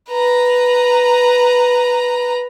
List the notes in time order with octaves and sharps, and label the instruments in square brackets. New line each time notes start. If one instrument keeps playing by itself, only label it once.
[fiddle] B4 A#5